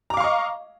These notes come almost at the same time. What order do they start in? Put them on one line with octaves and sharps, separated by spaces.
A#5 D6 F5 C#6 D#5